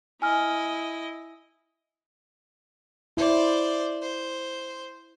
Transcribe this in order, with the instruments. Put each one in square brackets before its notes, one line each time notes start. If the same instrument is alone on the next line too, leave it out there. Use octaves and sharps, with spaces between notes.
[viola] E4 D#5 [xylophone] G#5 F6
[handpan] E4 [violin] C5 D5
[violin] C5